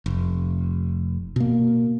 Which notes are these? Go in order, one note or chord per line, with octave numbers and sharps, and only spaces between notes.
F1
B2 A#3